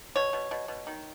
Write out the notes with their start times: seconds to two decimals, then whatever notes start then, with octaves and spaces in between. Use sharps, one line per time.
0.16 B2 C#5
0.33 B2
0.51 B2
0.68 B2
0.87 D#3